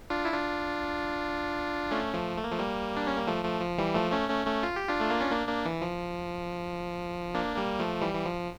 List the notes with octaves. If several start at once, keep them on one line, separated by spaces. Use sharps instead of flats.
D4 F4
E4
D4 F4
A3 C#4
F3 A3
A3
A#3
F3 A3
G3 A#3
D4
C#4
A#3
F3 A3
F3 A3
F3
E3 G3
F3 A3
A3 C#4
A3 C#4
A3 C#4
F4
G4
D4 F4
A3
A#3
C#4
A#3 D4
A#3 D4
E3
F3
A#3 D4
G3 A#3
F3 A3
E3 G3
E3
F3